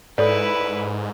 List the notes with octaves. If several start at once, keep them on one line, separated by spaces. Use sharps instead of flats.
G#2 E4 A4 B4 C#5 D5